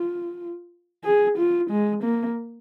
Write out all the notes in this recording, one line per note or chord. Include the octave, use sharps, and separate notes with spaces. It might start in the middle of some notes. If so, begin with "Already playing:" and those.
Already playing: F4
G#4
F4
G#3
A#3